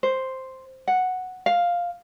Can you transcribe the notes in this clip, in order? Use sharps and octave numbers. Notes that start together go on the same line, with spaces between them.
C5
F#5
F5